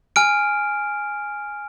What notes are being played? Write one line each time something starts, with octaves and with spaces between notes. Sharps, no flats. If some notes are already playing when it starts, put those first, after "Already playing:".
G#5 F6 D7